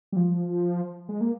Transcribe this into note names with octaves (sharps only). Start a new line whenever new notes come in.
G3
F3
G#3
A#3